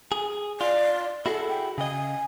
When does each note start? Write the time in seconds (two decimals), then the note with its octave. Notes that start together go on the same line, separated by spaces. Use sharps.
0.12 G#4
0.61 F4 D5
1.26 E4 F#4 G#4 A4
1.49 G5
1.78 C#3 D#5 G#5